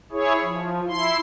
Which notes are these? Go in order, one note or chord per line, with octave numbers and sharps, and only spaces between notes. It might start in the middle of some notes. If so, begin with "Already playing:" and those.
E4 G#4 C#5
F3
E4 C6